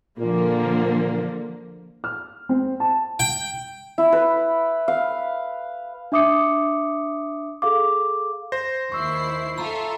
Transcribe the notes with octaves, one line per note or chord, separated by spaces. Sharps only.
A#2 D3 F3 A#3
F6
C4
A5
G5
E4
B4
F5
D4 E5 D6 D#6 C#7
G#4 A4 F5 D6
C5 A#6
D#2 E4 C#6 E6 C7
F4 A4 E5 A#5 B5